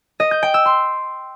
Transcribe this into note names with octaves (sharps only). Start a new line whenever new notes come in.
D#5
G6
G5
E6
C6